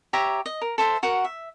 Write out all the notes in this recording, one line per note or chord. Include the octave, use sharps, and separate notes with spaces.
G4 C#5 E5 A#5
D#5
A#4
A4 C5 E5 C6
F#4 A#4 F#5
E5